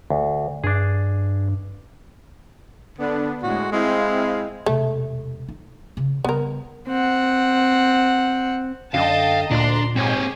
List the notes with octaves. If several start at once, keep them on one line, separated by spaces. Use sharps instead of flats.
D2
G2 D4 G#4
D3 B3 D4
A2 G#3 F#4
G#3 C4 E4 F5
E1 C3 A3
D#4
C#3
C#3 G3 B3 A#4
C4 F#5
F#2 D3 D#5 F5 G5 A5
D2 A#2 D4 A#5 C6
G#2 C4 G4 G#4 C#5 G5